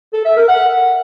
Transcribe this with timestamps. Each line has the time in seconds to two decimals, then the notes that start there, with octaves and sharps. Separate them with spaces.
0.13 A4
0.25 E5
0.37 A#4
0.48 F#5